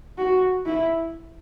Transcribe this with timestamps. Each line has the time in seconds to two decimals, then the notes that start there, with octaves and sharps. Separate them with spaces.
0.18 F#4
0.66 E4